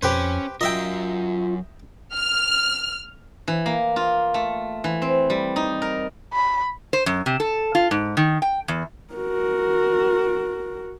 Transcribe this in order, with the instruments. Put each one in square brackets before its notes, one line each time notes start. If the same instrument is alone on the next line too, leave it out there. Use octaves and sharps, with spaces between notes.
[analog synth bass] F2 [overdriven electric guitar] C#4 [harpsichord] G4 B4 C5
[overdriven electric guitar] F#3 A#4 [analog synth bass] F4 [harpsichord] D#5 E5 G5
[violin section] F6
[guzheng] E3
A#3
F4
A3
E3
C4
G3
D#4
A#4
[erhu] B5
[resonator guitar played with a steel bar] C5
F#2
C3
A4
F4
G#2
D#3
G5
E2
[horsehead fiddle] F#4 A#4